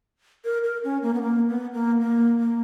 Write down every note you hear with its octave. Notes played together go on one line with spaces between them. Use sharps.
A#4
A#4
C#4
A#3
B3
A#3
B3
A#3
A#3
A#3